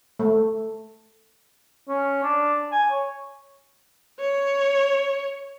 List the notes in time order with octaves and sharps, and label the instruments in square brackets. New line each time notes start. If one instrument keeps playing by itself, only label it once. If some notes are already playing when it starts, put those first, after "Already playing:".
[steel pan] A3
[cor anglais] C#4
D4
G#5
C#5
[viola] C#5